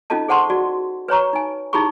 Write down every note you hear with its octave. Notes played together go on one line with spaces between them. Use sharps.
C#4 D#4 F4 A4 D#5 A5
G#4 C5 F#5 A5 C6 C#6
F#4 D5
B4 C#5 A#5 C#6
D#4 G#5
D#4 E4 G4 G#4 B5 C#6